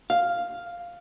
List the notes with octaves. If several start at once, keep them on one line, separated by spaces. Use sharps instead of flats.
F5